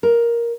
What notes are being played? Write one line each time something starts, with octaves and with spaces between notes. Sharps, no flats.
A#4